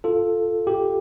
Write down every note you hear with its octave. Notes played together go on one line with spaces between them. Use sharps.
F4 A4
G4